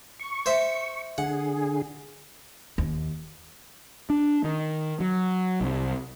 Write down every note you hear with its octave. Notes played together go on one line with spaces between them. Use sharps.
C#6
C5 E5
D3 G#4 F#5
D#2
D4
D#3
F#3
C2